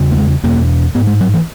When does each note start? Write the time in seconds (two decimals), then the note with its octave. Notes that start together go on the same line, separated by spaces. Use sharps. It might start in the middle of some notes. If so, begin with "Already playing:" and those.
Already playing: E2 C#3
0.11 A#3
0.18 G#3
0.43 E2 B2 A#3
0.95 G#2 B3
1.07 G#3
1.21 F#3
1.34 E3